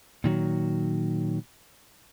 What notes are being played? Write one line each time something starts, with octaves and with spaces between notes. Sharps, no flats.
A#2 D#3 F#3